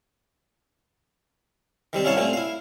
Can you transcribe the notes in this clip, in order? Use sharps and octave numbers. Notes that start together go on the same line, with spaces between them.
D#3 G3 C4
C#4 E4 C#5 F5 A5
A#2 A3 C4 C#4
E4 F5